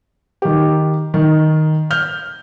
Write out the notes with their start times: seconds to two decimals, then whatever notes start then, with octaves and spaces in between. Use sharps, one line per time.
0.42 D#3 G4
1.14 D#3
1.91 F6 G6